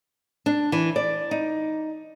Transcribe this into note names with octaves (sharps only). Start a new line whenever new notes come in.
D4
E3
D5
D#4